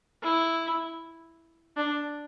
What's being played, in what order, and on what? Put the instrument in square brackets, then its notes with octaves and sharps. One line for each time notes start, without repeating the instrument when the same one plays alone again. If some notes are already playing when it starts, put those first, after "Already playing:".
[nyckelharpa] E4
D4